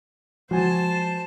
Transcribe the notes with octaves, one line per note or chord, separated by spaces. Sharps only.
F3 G#3 F#4 C5 G#5 A5